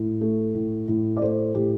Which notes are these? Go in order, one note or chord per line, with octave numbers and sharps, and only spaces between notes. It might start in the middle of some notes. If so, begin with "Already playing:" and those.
Already playing: A2
A3
A2
A2
D5
A3 C5
A2 G4